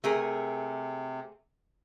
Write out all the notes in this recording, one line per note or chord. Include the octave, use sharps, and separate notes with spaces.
C3 A3 G#4 A#4